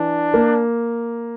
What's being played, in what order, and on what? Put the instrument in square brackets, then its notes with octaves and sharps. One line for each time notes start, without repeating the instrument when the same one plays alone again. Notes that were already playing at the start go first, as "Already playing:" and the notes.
Already playing: [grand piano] E3 [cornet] D4
[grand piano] A#3